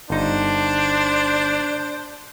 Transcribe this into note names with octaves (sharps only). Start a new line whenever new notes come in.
G1 D4 D#4 C5